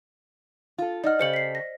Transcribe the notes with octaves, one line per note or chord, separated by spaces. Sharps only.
F4 A4
D#4 D5 D#5 F#5 F6
C#3 G4 A4 C5 C#7 F#7
B6 C7
A#6